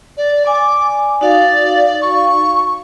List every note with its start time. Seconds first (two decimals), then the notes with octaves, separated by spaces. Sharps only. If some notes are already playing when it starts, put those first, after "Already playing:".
0.17 D5
0.46 D5 G#5 D6
1.21 D#4 F#4 D5 F5
2.02 C#6